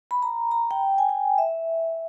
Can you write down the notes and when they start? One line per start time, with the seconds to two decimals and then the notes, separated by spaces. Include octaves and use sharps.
0.11 B5
0.22 A#5
0.51 A#5
0.71 G5
0.98 G#5
1.09 G5
1.38 E5